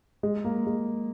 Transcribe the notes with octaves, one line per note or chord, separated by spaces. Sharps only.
G#3
A#3
G#3